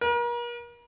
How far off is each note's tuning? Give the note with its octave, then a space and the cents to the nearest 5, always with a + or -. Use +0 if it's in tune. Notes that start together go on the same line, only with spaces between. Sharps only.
A#4 +40